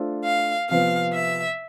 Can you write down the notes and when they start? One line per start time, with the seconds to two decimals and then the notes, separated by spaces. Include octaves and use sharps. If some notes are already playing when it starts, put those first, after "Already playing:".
Already playing: A3 D4 F4 A4 C5
0.24 F5
0.69 C3 F3 B3 F5
1.13 E5